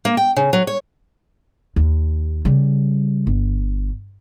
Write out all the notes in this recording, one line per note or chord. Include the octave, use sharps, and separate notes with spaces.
A#3
G5
C#3
F#3
C#5
D#2
C#3 G3
G1